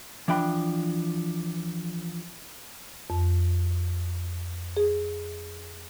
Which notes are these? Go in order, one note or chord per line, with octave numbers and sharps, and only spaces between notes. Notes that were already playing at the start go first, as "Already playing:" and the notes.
E3 F3 D4 G5 B5
F2
G#4